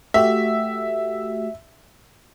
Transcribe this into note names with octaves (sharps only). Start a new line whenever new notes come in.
A3 F#4 G4 E5